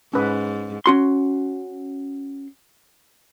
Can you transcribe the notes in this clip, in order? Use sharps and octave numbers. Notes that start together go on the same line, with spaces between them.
G#2 C#4 B4
C#4 F#4 C6